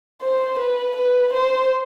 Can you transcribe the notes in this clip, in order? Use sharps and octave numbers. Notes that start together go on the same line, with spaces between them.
C5
B4
B4
C5